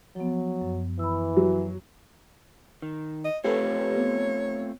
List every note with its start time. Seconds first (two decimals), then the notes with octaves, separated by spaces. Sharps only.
0.16 F3 F#3 B3
0.62 F#2
0.99 E3 B5 E6
1.37 F#3
2.82 D#3
3.25 D#5
3.44 A3 C4 F4 G4 A4 B4 C#5
3.96 B3